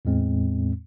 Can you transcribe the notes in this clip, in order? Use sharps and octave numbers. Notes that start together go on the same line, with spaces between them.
E2 A2 G#3 C4